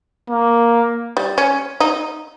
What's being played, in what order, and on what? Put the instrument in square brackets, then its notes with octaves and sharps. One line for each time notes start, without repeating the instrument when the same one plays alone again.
[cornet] A#3
[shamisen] G3
C#4
D#4